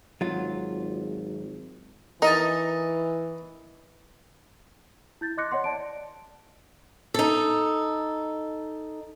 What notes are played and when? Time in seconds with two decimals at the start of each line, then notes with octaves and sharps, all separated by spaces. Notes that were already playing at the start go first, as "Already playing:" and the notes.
0.21 G#1 F#3 F4
2.22 E3 D#4 A#4 D#5 A5
5.21 E4 G6 A6
5.37 D#5 C6 D6 F#6 A#6 C#7
5.51 C#5 D#5 F#5 C6
5.64 D5 A5 D7
7.14 D#4 A4